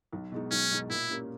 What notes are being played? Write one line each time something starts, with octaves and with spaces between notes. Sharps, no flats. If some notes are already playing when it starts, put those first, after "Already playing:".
B1
B2 G#3 D#4
B1 C#4
B2 G#3 D#4
A#2 E4
A#3 C#4 G4